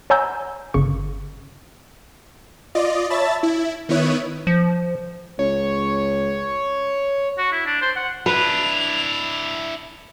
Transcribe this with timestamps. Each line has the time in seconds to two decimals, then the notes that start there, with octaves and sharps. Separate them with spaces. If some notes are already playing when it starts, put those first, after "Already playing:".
0.10 C#5 F#5 G#5 A#5 E6 G6
0.74 G1 C#3 C#6
2.75 F4 D5 D#5
3.10 C#5 E5 A5 B5 A6
3.43 E4
3.89 D#3 B3 E4 C#5 F#6 D#7
4.47 F3
5.39 C#2 C#5
7.38 F#4
7.52 E4
7.66 D4
7.82 C5
7.96 F#5
8.26 D4 E4 B4 F7